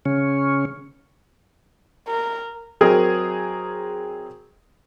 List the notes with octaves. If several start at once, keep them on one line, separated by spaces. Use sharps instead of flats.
C#3 C#4
A#4
F#3 C4 G#4 A#4 D#5